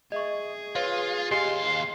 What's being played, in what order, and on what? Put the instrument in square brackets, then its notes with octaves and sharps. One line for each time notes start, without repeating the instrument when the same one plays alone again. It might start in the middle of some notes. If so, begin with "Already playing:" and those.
[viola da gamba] G#4 [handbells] D#5 E5 C#6
[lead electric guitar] F4 [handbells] B4 C#5 F5
[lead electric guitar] D#2 F5 [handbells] G4 D#5 G#5 [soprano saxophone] C6